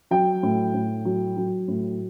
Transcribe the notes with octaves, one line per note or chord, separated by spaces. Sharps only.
F#3 G5
A2
A2
F#3
F#3
A2